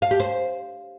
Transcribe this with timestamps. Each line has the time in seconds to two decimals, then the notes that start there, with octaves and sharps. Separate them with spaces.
0.02 F5
0.11 G4
0.20 C5